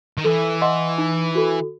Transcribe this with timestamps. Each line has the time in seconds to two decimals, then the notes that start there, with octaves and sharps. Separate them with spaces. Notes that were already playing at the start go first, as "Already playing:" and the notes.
0.18 D#3
0.24 E3 A4
0.62 D#5 F#5 C6
0.98 D#4
1.35 F#4 A4